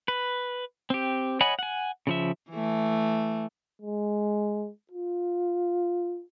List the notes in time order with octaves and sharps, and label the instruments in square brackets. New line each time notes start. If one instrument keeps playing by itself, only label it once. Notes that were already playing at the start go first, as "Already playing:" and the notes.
[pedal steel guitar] B4
C4 G4
C#5 D#5 F#5 G#5 B5
F#5 G#5
C#3 F3 E5
[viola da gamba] E3 A3
[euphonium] G#3
F4